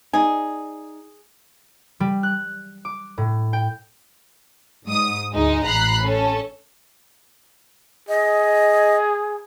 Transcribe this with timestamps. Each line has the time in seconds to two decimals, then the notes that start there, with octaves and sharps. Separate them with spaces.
0.13 D#4 G#4 D5
2.00 G3
2.23 F#6
2.85 D6
3.18 A2
3.53 G5
4.85 G#2 D#6
5.33 D2 G#3 D#4 D#5
5.64 A1 A#5 B5 F#6 C7
6.02 C#4 A4
8.09 G#4 D#5